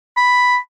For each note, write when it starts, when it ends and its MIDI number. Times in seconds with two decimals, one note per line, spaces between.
0.17 0.57 83